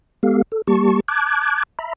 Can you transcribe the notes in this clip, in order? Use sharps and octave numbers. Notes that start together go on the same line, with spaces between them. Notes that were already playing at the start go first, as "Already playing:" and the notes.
G#3 B3 G4 A4 F5
A4
G3 A#3 G4 A5 C#6
A5 D6 F#6 G#6
E5 A#5 B5